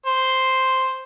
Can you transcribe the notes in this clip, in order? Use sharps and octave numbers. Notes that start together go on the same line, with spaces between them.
C5